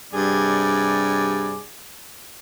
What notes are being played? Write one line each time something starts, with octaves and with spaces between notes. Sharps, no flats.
G2 C3 G#4 D5